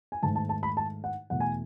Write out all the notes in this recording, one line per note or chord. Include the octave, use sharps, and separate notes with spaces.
G#5
G#2 D#3 A3 A5
A5
A5
B5
A5
F#5
E2 B2 A3 F#5
G#5